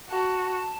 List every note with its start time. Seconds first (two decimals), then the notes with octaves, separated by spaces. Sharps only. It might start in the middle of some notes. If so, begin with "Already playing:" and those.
0.10 F#4 A5